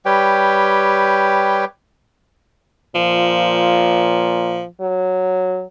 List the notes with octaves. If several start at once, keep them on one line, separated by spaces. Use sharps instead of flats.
G3 G4 B4 C#5 G5
A#2 F3
F#3